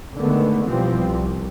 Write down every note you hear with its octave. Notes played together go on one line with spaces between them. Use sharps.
D3 D#3 G#3 A3 B3
B2 E3 F3 G3 B3 C4
C2